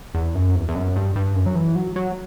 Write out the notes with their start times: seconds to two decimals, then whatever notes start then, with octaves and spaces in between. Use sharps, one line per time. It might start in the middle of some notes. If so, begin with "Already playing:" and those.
0.15 E2
0.35 F#2
0.55 E2
0.69 E2
0.76 F#2
0.96 G2
1.16 G2
1.36 F#2
1.46 F#3
1.55 E3
1.75 F#3
1.96 F#3